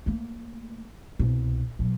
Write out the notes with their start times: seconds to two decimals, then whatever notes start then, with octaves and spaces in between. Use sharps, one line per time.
0.06 A3 A#3
1.19 C2 B2
1.79 B2 F#3